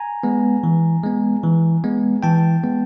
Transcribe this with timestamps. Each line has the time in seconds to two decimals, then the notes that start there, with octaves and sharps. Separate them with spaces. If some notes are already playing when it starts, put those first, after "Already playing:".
Already playing: G#5 A#5
0.23 G#3 B3
0.64 E3
1.03 G#3 B3
1.44 E3
1.84 G#3 B3
2.23 E3 G5 A5
2.64 G#3 B3